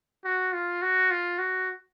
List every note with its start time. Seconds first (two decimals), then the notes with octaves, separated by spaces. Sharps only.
0.25 F#4
0.53 F4
0.82 F#4
1.11 F4
1.39 F#4